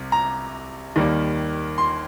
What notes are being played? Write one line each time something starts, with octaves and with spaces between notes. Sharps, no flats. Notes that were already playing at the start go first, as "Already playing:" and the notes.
Already playing: C2 C3
A#5
D#2 D#3 G3 A#3
C6